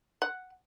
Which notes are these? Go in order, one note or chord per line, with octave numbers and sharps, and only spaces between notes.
F#5